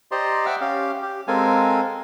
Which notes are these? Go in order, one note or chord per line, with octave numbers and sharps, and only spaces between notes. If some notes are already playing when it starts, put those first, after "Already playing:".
G4 C5 D5 D#5 A#5 C6
E5 F#5 G5 D6 E6 F6
C#4 G4 F5
G4
G#3 C4 A4 A#4 F5 G#5